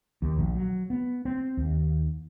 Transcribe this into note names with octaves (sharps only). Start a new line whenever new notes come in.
D#2
A#1
F#3
B3
C4
D#2